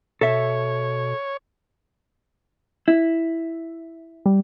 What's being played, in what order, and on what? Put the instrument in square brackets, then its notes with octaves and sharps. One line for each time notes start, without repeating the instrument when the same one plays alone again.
[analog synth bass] B2 [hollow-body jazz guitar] A4 E5 [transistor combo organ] C#5
[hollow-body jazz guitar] E4
[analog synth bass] G3